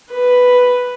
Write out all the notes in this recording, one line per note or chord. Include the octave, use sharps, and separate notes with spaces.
B4